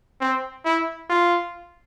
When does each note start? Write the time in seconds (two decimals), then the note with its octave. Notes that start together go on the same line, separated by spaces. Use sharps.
0.21 C4
0.65 E4
1.10 F4